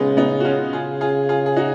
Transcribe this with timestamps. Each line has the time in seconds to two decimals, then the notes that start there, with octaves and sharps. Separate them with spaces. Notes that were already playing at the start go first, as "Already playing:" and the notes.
Already playing: C#3 G#3 B3 D#4 F4
0.17 B3 D#4
0.40 F#4
0.45 C#4 F4
0.73 C#3 F4 G#4
1.01 F4 G#4
1.29 F4 G#4
1.46 G#4
1.56 D#4 F#4